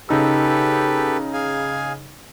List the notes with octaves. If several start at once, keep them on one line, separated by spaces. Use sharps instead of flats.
C#3 D#4 G4 A4 B4 E6
G#4 F5 G#5